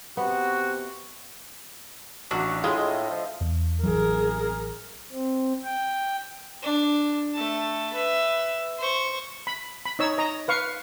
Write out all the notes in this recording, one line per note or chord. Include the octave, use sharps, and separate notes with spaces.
C3 B3 F#4
A1 F#3 D4 F#4
A2 G#3 E4 F4 G#4
D#5 E5
F3
E2
A1 E3 F#3 G#4 A#4
C4
G5
D4
A3 A5
B4 E5
C5 C#6
B5
B5
D#4 C#5 E6
D#5 A#5
B4 F5 C#6